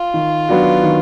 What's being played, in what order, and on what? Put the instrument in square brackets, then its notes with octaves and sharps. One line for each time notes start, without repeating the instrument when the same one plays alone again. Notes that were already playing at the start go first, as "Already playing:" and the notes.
Already playing: [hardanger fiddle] F4
[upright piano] D#3
F#3 B3 D4 F#4
D#3